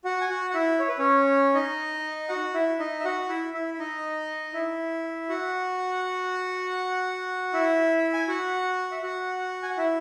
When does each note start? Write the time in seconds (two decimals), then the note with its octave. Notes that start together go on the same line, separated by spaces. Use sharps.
0.05 F#4 F#5
0.21 G#5
0.29 F#4 F#5
0.51 F#5
0.54 E4 E5
0.79 C#5
0.88 B4
0.98 C#4 C#5
1.54 D#4 D#5
2.29 F#4 F#5
2.54 E4 E5
2.79 D#4 D#5
3.00 E5
3.04 F#4 F#5
3.29 E4 E5
3.54 E4 E5
3.74 E5
3.79 D#4 D#5
4.54 E4 E5
5.29 F#4 F#5
7.53 E4 E5
8.13 G#5
8.28 F#4 F#5
8.92 E5
9.03 F#4 F#5
9.63 G#5
9.70 F#5
9.78 E4 E5